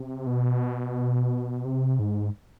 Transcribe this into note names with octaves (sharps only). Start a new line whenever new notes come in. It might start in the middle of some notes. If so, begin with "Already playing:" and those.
Already playing: C3
B2
C3
G#2